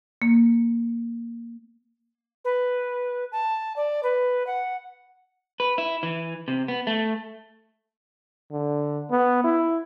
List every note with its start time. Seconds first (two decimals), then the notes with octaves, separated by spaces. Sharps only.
0.22 A#3
2.44 B4
3.32 A5
3.76 D5
4.03 B4
4.46 F#5
5.60 B4
5.78 E4
6.03 E3
6.48 C3
6.68 B3
6.87 A3
8.52 D3
9.11 B3
9.44 E4